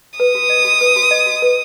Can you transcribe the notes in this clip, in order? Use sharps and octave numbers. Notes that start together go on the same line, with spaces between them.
B4 D#6
F#4
D#5
F#4
B4
F#4
D#5
F#4
B4